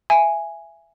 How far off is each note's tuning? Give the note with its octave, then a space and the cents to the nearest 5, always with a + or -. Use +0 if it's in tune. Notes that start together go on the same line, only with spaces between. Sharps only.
E5 +25 G#5 +0